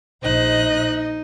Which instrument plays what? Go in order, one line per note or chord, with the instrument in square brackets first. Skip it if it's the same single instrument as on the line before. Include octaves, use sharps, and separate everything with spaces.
[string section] A#1 [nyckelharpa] D#4 [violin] C5 F#6 [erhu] D#5